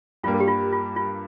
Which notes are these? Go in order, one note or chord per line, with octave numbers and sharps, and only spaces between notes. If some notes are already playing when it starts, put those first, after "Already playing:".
G2 G3 A#3 F4
A#4
G4
F4
F4
F4